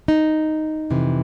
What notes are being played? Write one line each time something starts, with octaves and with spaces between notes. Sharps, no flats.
D#4
F2 C3 E3